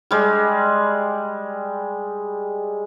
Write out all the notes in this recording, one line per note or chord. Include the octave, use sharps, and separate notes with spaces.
G3 G#3